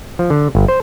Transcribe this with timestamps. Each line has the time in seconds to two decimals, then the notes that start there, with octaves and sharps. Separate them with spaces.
0.19 F3
0.30 D3
0.55 G1
0.68 C5